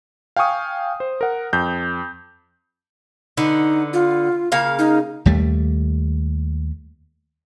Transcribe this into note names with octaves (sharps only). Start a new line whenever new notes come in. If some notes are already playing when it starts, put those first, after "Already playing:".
F5 G5 G#5 C#6 D#6
C5
A#4 F#5
F2 G6
D3 B3 D#4
F4
C#3 A#3 F5
D#4
D#2 G3 A3